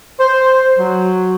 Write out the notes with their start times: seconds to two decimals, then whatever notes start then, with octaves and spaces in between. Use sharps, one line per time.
0.18 C5
0.77 F#3